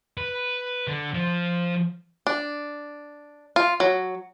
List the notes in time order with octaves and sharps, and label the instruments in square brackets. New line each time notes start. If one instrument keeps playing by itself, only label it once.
[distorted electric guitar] B4
D3
F3
[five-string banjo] D4
F4
F#3